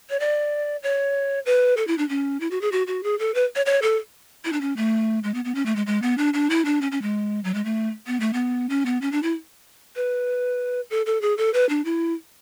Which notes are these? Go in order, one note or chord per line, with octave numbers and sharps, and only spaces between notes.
C#5
D5
C#5
B4
A4
E4
D4
C#4
E4
F#4
G#4
F#4
F#4
G#4
A4
B4
C#5
C#5
A4
E4
D4
C#4
A3
G#3
B3
B3
C#4
A3
G#3
G#3
B3
D4
D4
E4
D4
C#4
C#4
G#3
F#3
G#3
A3
B3
A3
B3
C#4
B3
C#4
D4
E4
B4
A4
A4
G#4
A4
B4
D4
E4